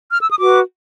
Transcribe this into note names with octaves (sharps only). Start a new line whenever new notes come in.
F6
E6
D#6
F#4 B4 D6